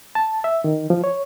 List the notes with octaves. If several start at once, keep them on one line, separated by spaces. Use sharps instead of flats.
A5
E5
D#3
F3
C#5